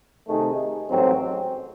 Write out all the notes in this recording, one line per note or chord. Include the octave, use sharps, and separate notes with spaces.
C3 D#3 A3 D#4 G#4
A1 G#2 F#3 C4